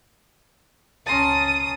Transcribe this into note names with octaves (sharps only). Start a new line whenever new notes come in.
C#2 C#4 A5 A#5 C6 D#6